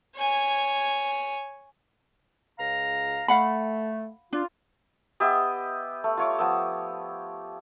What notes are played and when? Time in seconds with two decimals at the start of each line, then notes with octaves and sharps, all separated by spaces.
0.17 C#5 G#5
2.58 C#2 F5 A#5
3.28 A3 F5 F#5 B5
4.33 D4 F4
5.20 B3 G4 D#5 E5
6.04 A3
6.17 F4 C#5 D6
6.39 F3 B3 E6